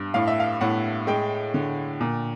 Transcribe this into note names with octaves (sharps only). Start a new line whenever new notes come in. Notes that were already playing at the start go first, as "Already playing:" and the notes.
Already playing: G2
A2 F5
E5
F5
A2 F#5
G#3 G5
D3
A#2